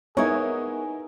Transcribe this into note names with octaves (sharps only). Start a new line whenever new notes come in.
B3 D#4 E4 G#4 A#4 C#5